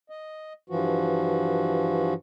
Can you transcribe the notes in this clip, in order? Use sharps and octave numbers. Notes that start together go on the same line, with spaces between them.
D#5
G2 E3 F3 F#4